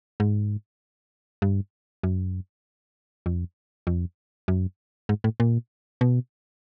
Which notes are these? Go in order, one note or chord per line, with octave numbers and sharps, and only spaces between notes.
G#2
G2
F#2
F2
F2
F#2
G#2
A2
A#2
B2